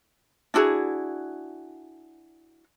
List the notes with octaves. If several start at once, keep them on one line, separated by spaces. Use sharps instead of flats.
D4 E4 F#4 G#4